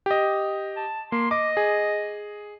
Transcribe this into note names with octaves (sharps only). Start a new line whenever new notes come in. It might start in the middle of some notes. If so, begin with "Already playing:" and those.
G4 D#5
A5
A#3 C6
D#5 D6
G#4